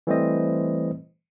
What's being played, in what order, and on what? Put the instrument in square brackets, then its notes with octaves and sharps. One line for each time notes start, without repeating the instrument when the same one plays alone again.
[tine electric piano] E3 G3 A3 C4 C5 D#5